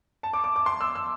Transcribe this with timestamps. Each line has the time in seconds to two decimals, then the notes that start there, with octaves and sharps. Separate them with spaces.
0.23 A5
0.33 D6
0.44 D6
0.56 D6
0.66 C6
0.81 E6
0.95 E6